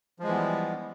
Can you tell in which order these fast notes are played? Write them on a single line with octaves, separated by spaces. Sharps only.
F3 G#3 E3 B3 G3